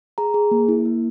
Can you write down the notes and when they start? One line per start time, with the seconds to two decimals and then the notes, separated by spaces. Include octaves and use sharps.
0.18 G#4 A#5
0.34 G#4
0.51 A#3
0.69 E4
0.85 A#3